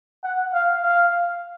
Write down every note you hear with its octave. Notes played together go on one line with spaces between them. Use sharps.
F#5
F5
F5